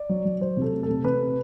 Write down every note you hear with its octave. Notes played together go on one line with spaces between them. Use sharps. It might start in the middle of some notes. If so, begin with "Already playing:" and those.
Already playing: D5
F#3
F#3
F#3 C5
C3 A4
A3
A4
C3
C3 B4